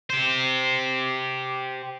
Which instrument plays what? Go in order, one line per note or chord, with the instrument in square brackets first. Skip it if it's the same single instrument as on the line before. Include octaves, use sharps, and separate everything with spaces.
[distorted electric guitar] G4 C5